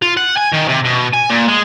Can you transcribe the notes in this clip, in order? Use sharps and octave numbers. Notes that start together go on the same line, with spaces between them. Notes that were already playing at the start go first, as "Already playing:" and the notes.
F4
F#5
G#5
D#3
C3
B2
G#5
A#2
G#3